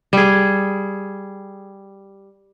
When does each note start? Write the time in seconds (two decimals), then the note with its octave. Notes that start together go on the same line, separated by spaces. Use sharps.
0.13 G3 G#4